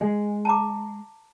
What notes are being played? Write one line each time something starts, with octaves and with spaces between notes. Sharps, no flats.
G#3
A5 A#5 D6